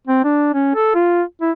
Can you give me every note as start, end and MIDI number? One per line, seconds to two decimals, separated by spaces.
0.07 0.20 60
0.24 0.51 62
0.54 0.75 61
0.75 0.94 69
0.95 1.23 65
1.41 1.51 64